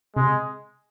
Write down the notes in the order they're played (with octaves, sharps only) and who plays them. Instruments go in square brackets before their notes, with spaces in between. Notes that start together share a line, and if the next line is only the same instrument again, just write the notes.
[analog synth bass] C3 [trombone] G#3